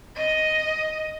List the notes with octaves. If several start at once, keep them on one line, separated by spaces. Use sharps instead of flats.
D#5